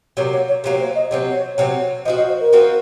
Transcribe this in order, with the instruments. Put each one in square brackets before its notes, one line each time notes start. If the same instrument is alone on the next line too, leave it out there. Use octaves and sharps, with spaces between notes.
[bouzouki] C3 F#3 A#3 [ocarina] C#5
[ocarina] C#5
C#5
[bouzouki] C3 F#3 A#3 [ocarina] C#5
[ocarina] C5
D#5
[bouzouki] C3 F#3 C4 [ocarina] C#5
[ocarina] C#5
[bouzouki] C3 F#3 C4 [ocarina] C#5
[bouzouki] F3 C4 F#4 [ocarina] D#5
[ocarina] D#5
C5
A#4
[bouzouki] F3 C4 F#4